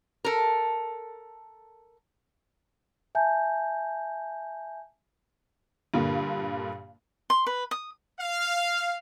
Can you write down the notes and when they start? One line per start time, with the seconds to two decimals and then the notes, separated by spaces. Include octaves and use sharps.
0.25 A4 A#4
3.15 E5 G#5 A5 G6
5.94 G2 A#2 D3 A#3
7.30 C6
7.47 B4
7.71 D#6
8.20 F5